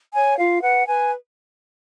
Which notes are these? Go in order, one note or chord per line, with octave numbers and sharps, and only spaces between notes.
C#5 G#5
F4 F5
B4 F#5
B4 G#5